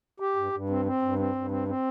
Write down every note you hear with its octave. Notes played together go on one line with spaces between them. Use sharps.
G4
G2
G2
C4
C4
G2
C4
G2
C4
C4